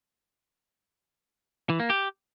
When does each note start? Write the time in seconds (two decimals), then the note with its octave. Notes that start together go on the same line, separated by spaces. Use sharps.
1.70 E3
1.80 A#3
1.90 G4